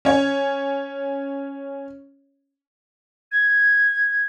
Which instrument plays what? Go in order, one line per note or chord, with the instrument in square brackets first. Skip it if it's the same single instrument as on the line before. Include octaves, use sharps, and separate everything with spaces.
[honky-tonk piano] C#4 C#5
[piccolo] G#6